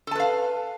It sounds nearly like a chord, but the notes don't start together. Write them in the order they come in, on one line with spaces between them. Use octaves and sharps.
A4 A5 B4 F5